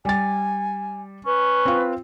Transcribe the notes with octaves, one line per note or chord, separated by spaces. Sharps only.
G3 G#5 A6
C#4 B4
C4 F4